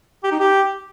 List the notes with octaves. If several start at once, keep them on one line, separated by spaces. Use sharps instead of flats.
G4
D#4
G4